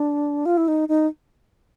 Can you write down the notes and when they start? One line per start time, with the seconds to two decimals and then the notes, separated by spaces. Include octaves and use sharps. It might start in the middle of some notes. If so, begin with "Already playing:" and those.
Already playing: D4
0.46 F4
0.57 E4
0.68 D#4
0.89 D#4